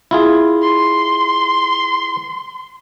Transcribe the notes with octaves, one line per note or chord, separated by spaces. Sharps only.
E4 F4 G#4
C6